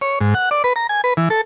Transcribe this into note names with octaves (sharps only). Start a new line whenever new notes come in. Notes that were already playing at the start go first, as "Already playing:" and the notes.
C#5
G#2
F#5
D5
B4
A#5
G#5
B4
E3
A4